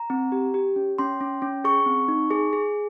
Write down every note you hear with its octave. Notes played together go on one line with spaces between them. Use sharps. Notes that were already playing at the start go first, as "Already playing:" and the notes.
Already playing: A#5
C4
G4
G4
C#4
C#4 C6
C#4
C#4
G#4 C#6
C4
D#4
G#4
G#4